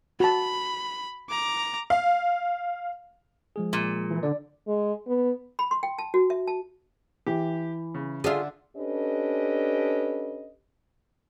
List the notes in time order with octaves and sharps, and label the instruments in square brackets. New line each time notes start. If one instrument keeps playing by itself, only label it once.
[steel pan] F#4 A5 [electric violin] B5
[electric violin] A#5 D6
[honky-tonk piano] F5
[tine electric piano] F3 G#3 G#4
[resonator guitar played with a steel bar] A#2
[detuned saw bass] E3
[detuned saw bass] D3 [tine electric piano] D5
[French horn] G#3
B3
[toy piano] B5
C6
G5
A5
F#4
E5
A5
[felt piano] E3 [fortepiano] G4
[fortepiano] C#3
[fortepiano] D3 D4 E5 [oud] F4 G#4
[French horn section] C#4 D4 G4 A4 B4 D#5